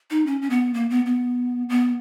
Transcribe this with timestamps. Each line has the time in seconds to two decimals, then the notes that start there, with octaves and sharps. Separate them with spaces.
0.10 D#4
0.26 C#4
0.42 C#4
0.50 B3
0.74 A#3
0.90 B3
1.06 B3
1.69 B3